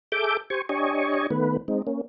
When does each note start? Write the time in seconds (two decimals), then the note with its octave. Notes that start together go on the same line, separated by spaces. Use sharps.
0.12 G#4 A4 E5 D6 G6
0.50 G4 C5 G#5 C#6
0.69 D4 G4 C#5 D#5 G#5 C#6
1.31 D#3 A3 B3 B4
1.68 G#3 C4 D#4
1.87 A#3 C#4